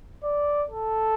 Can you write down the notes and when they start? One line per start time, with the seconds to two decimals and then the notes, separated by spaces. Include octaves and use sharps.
0.24 D5
0.70 A4